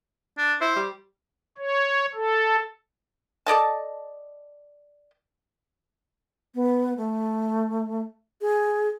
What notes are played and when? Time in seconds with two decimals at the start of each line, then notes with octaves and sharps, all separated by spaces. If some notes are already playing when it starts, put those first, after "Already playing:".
0.38 D4
0.61 E4 C5
0.76 G3
1.58 C#5
2.14 A4
3.46 A4 D5 D#5 A5
6.55 B3
6.97 A3
8.41 G#4